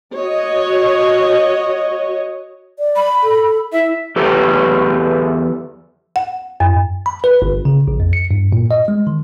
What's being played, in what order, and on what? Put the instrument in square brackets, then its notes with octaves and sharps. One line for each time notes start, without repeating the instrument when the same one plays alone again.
[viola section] F#4 C#5 D#5
[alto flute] D5
[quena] B5
[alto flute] A4
[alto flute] E4 [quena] E5
[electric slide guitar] E2 G4 A4 B4
[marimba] F#5
F#2
[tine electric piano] B5
B4
G1
C#3
A#1
F2
C#7
G2
A#2
D#5
G#3
D#3